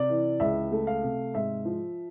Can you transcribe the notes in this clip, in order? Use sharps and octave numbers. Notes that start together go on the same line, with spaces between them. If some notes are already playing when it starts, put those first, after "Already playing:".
Already playing: C3 D5
E3
C#2 E5
A3
F5
C3
G#2 E5
F3